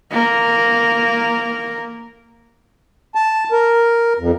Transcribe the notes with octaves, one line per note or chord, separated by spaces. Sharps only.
A#3 A#4
A5
A#4
F2